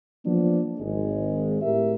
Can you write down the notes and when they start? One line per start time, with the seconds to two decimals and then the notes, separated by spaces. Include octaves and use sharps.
0.24 F3 A#3 B3 D4
0.78 G#1 G#3
1.62 A2 G4 A#4 E5